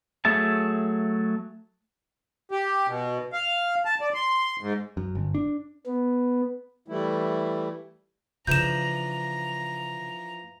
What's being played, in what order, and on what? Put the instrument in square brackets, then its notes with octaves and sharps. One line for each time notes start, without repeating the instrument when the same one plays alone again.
[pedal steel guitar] F#3 A3 G#4 E5 A5
[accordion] G4
B2
F5
A5
D5
C6
G#2
[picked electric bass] F#2
G1
D4
[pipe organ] B3
[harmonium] E3 G3 A3 E4
[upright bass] C#3 [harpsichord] E3 F3 D4 [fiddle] A#5 [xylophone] G6 E7